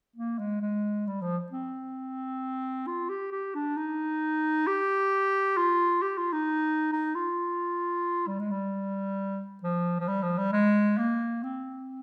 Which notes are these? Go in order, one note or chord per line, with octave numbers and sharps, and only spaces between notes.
A#3
G#3
G#3
G3
F3
C4
F4
G4
G4
D4
D#4
G4
F4
G4
F4
D#4
D#4
F4
G3
G#3
G3
F3
F3
G3
F3
G3
G#3
A#3
C4